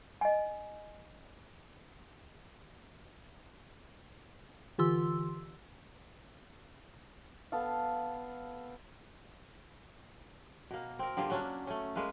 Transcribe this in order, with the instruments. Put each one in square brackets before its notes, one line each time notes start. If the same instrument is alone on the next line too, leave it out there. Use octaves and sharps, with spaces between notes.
[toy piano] D#5 G#5
[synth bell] D3 E3 F4 G4 C6 E6
[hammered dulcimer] B3 A4 F5
[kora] B2 A#3
C4 A#4
D3 G3 A#3 F4
F#3 C#4 D4
A3 C#4
G#3 A#3 B4 F5